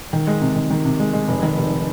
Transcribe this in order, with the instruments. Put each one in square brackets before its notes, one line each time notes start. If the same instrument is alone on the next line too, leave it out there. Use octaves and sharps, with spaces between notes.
[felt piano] D#3
G#3
C3
D#3
D#3
C3
G#3
G#3
F1
D#3
F1